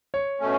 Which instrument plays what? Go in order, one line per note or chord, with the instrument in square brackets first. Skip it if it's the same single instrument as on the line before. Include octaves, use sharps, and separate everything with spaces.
[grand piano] C#5
[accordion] B2 A3 C#4